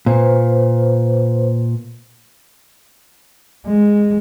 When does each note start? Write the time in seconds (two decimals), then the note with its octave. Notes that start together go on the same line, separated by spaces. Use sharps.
0.06 A#2 B4 C5
3.67 G#3